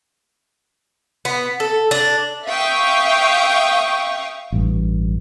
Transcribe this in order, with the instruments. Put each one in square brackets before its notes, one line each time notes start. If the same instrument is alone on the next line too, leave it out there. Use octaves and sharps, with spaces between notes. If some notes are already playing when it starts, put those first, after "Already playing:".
[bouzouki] B3
A4
D4
[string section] E5 F5 G5 C#6 D#6
[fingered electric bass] A1 G2